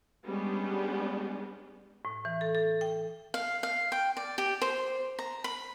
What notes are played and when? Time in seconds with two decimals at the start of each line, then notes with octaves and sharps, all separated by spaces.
0.25 G3 G#3 B3 C#4 D4 G4
2.05 A2
2.25 E3
2.41 A4
2.55 A4
2.81 G5
3.34 F5
3.63 F5
3.92 G5
4.17 D5
4.38 G4
4.62 C5
5.19 A#5
5.44 B5